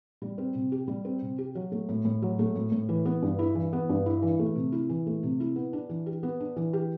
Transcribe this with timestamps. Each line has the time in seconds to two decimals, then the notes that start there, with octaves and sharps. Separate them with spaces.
0.22 G3
0.38 C4
0.55 C3
0.72 G4
0.88 G3
1.05 C4
1.22 C3
1.38 G4
1.55 F#3
1.72 A3
1.89 A2
2.05 A2
2.22 F#3
2.39 A3
2.55 A2
2.72 A2
2.89 E3
3.05 B3
3.22 G2
3.39 E4
3.55 E3
3.73 B3
3.89 G2
4.06 E4
4.22 E3
4.39 A3
4.55 C3
4.72 E4
4.89 E3
5.06 A3
5.23 C3
5.40 E4
5.56 B3
5.73 D4
5.89 E3
6.06 G4
6.23 B3
6.40 D4
6.56 E3
6.73 G4